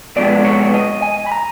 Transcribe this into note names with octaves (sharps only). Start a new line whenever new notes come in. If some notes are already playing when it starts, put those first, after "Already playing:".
B1 A#2 F3 G#3 B3 D5
C#5
D#5
G#5
B5
A#5